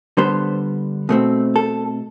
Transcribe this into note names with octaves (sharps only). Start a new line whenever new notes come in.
D3 G3 B3 C5
B2 A3 C4
A4